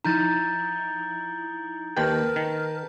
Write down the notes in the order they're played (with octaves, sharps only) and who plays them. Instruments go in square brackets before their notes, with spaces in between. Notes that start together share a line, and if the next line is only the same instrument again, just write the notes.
[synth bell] F3 D#4 E4 [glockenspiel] A#5 G6 A6
[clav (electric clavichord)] D#2 D#3 G5 [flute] A#4 [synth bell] B4 A5
[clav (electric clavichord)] D#3